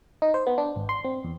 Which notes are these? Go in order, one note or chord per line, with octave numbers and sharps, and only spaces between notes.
D#4
C5
B3
D4
G#1
C6
C4
E2